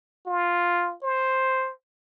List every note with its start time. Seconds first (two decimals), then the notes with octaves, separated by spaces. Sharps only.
0.26 F4
1.03 C5